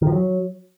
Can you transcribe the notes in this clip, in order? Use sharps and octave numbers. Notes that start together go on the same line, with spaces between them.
D#3
F3
F#3